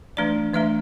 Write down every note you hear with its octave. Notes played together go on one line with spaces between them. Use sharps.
E3 A3 D4 D5
E3 A3 D4 E5